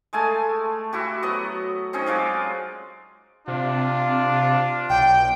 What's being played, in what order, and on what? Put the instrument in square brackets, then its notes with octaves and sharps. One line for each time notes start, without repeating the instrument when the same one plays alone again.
[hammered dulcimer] G#3 A3 G#5 A5
E4 F#4 G4
F#3 B3 D#5
C4 C#4 D#4 C#5
F#3 G#3 F4 D5
[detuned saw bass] C3 [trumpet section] D4 F4
[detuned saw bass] B1 [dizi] G5